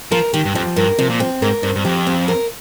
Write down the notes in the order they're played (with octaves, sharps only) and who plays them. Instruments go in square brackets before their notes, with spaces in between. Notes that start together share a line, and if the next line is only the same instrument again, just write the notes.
[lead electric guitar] F3 [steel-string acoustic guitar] A#4
[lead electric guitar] D#3 [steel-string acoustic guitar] G4
[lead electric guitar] G2
[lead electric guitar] F2 [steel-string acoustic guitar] F3
[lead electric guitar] G2 [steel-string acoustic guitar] A#4
[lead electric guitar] C3 [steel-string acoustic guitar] F3
[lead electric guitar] A#2
[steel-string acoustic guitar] C4
[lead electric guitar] G#2 [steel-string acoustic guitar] A#4
[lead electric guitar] G2 [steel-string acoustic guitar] C4
[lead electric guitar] G2
[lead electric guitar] F2 [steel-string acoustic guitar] G4
[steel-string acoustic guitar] C4
A#4